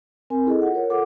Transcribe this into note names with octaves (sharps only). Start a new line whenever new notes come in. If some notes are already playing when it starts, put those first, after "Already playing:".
C4 A#4 G#5
E4 G#4 A4 D#5
F4 F#5
A#4 C#5
F4 A4 F#5 D6